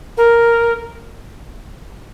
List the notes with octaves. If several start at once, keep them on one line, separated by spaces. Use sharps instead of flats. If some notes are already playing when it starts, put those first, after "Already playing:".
A#4